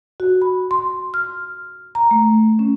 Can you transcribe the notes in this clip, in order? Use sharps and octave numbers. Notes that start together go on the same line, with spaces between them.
F#4
B5
C6
F6
A#5
A3
C#4